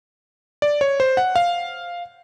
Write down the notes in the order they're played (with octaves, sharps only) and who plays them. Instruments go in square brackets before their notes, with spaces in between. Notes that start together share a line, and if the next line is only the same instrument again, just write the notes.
[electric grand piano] D5
C#5
C5
F#5
F5